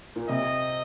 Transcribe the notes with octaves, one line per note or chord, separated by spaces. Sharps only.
A#2
C3 D#5